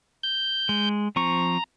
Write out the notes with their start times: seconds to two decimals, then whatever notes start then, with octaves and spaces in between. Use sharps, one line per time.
0.23 G6
0.69 G#3
1.16 F3 C4 A#5 C#6